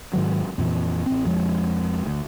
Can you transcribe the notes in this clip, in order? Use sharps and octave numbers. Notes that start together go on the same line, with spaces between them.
G#2 D#3 F#3
F2 A#2 E3
A1 C4
F2 F3 G#3
D2